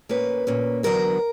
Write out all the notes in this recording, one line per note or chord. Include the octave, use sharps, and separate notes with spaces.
A#2 A#3 C#4 B4
A#2 A#3 C#4
E2 D3 F#3 B3 D4 A#4